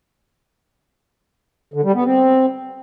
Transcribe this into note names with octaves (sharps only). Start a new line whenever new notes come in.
D3
G3
B3
C4